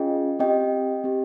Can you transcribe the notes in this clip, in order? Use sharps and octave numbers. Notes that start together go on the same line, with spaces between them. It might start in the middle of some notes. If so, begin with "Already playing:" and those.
Already playing: C#4 F4 G#4 D#5 G5
C4 G4 D#5 G5
C4 G4